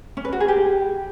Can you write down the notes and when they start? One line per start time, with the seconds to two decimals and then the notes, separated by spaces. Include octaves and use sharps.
0.17 C#4
0.25 B4
0.33 F#4
0.40 G#4
0.48 G4